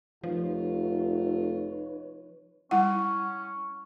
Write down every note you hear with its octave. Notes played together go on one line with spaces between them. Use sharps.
F1 F3 D#4 F4 B4 C#5
G3 C#4 E4 F#5